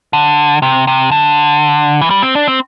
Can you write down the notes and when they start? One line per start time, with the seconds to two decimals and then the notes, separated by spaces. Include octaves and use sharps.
0.13 D3
0.62 C3
0.87 C3
1.11 D3
2.01 E3
2.10 G3
2.23 C4
2.35 D4
2.48 C4